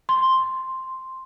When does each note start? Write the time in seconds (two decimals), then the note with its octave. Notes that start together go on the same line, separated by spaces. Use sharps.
0.09 C6